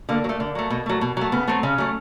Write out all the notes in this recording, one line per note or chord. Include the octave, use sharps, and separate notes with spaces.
D3 A#3
F#3
A3
D3
F#3 A3
B2
F#3 A3
B2
F#3 A3
C#3 B3
F#3 A3 C4
C#3 C#4
F#3 A3